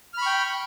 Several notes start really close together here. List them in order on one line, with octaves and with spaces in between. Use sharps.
F6 B5 C#6 G5